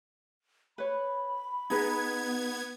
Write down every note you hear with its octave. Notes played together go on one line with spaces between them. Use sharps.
B4 C#5 B5
B3 D#4 G#4 B4 G#6